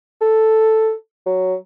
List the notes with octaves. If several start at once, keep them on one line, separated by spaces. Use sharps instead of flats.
A4
F#3